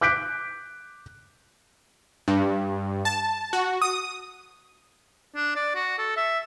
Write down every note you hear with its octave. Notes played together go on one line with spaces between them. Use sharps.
D6 F#6 G6 B6 D7
G2
A5
F#4
D#6
D4
D5
F#4
A4
E5